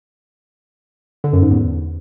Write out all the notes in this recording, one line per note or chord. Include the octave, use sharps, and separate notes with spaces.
D3
F#2
G#2
E2